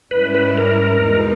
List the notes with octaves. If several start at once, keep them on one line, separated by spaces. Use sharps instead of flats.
G#2 G3 C#4 E4 B4
B4
A#4
E2 B2 G#3 D#4